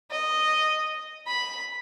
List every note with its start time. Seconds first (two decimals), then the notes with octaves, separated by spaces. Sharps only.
0.11 D#5
1.27 B5